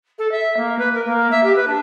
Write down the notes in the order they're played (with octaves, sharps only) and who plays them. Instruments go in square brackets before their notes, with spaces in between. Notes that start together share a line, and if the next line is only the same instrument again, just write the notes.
[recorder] A4
E5
A#3
B4
A#4
A#3
E5
G4
B4
D4